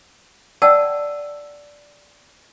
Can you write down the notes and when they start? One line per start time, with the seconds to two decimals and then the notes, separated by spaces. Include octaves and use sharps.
0.62 D5 D#5 F#5 G5 A5 E6